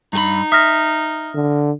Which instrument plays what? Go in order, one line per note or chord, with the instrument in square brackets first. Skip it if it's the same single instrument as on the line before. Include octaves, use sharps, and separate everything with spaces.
[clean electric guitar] G2 G#4 B5 [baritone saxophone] D#4
[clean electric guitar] E5 [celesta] D#6 F6 A#6
[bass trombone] D3